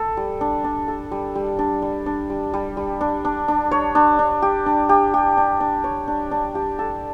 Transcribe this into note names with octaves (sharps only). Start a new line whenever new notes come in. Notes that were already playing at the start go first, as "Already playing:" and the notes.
Already playing: A4
G3
D4
D4
A4
G3
G3
D4
G3
D4
G3
G3
G3
D4
D4
D4
C#5
D4
D4
G4
D4
G4
G4
D4
D4
C#5
D4
D4
G4
A4